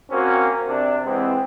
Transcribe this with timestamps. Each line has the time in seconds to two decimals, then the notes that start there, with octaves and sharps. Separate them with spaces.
0.11 A#3 C4 C#4 F#4 A#4
0.68 C3 D4
1.05 E3 G#3 B3 C4